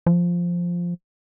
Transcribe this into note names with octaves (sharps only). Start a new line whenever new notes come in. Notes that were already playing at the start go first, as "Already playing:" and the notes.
F3